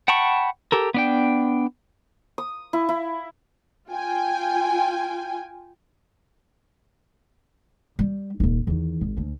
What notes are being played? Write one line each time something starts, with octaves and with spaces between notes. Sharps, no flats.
F#5 G5 A5 B5 C#6
G4 A4 A#4
B3 D4 G5
D#6
E4
E4
F4 G5 G#5
G3
D#1 C2
E2 D#3
G#1
D2